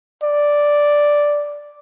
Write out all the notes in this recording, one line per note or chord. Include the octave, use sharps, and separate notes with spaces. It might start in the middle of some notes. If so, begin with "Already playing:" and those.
D5